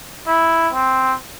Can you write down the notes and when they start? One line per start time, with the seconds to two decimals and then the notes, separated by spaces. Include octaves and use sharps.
0.27 E4
0.74 C4